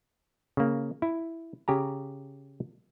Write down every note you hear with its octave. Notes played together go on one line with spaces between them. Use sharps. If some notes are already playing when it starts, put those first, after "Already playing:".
C#3 A#3
E4
C#3 G4 G#5 A#5